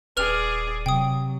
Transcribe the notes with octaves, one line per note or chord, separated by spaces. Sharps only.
D#1 G#4 B4 D5 F6 F7
C3 F#3 G5 D#6